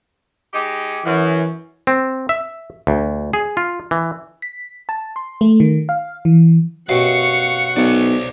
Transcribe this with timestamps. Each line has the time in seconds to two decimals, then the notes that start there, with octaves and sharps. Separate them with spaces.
0.53 G#3 D#4 G4
1.05 F#2 E3
1.87 C4
2.29 E5
2.87 D2
3.33 G#4
3.57 F4
3.91 E3
4.42 B6
4.89 A5
5.16 C6
5.41 A3
5.60 D#3
5.89 F5
6.25 E3
6.89 F#2 B2 G4 F5 F#5 C#6
7.76 B1 C5 D5